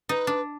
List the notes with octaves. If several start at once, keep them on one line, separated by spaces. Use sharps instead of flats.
D#4 B4
D4